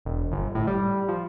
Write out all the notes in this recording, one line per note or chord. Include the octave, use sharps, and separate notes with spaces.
E1
G1
A2
G3
F3